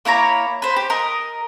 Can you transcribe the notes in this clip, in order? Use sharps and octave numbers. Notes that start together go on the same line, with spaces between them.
A#3 E4 C#5 A#5
B4 C5
G4
A#4 D#5